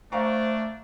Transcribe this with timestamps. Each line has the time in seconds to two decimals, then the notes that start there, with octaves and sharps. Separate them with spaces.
0.12 A3 D4 C5 F5 A#5 C#6